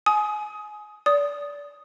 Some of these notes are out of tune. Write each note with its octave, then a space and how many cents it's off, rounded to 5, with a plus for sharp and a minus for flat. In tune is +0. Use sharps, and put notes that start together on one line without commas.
G#5 +25 D#6 +15
D5 -25 D#6 +0